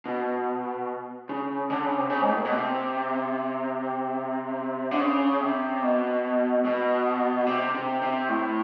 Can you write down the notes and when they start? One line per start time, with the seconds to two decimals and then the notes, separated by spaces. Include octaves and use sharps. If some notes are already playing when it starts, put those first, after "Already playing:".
0.05 B2
1.29 C#3
1.70 D3
1.84 C#3
1.98 C3
2.10 C#3
2.22 G#2
2.29 A2
2.37 A#2
2.45 B2
2.53 C3
4.91 D3
5.00 C#3
5.40 C3
5.83 B2
6.65 B2
7.47 C3
7.74 C3
8.02 C3
8.29 A2